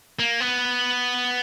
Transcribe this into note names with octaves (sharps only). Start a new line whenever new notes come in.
A#3
B3